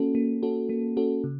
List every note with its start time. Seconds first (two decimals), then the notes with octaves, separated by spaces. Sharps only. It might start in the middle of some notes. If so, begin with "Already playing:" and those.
Already playing: A#3 C#4 F#4 A4
0.15 A#3
0.43 C#4 F#4 A4
0.69 A#3
0.97 C#4 F#4 A4
1.24 C#3